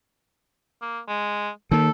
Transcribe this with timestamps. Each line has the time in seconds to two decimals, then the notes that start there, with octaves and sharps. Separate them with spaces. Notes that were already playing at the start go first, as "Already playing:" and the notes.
0.82 A#3
1.08 G#3
1.71 D#3 A#3 A4